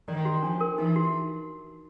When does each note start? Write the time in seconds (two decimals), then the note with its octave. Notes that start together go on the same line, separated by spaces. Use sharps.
0.08 D#3 D5
0.25 F#4
0.43 F3 D4
0.61 A#4
0.78 E3 D#4
0.96 F#4